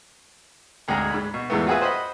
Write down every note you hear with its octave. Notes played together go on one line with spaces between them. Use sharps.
G#1 D2 G#3 G#4 A#5
G#2 B5
B2
E2 G#2 E3 A3 B3
F4 F#4 G#4 B4 E5
C5 D#5 F#5 B5